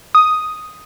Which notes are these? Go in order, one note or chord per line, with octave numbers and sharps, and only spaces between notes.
D#6